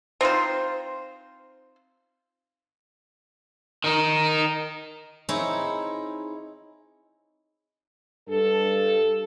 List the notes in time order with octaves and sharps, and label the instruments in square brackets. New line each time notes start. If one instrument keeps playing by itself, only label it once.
[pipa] C4 D#4 F4 C5
[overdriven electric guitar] D#3 D#4
[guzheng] C4 D#4 E4 G#4 C#5
[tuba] G2 [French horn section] A4